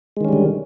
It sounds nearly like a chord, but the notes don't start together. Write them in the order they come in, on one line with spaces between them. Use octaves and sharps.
G#3 D#3 C#4 G3 D3